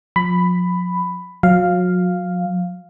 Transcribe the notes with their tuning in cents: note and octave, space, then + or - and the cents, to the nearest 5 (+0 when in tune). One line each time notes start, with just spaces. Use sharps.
F3 +40 B5 +10
F#3 -35 F5 +0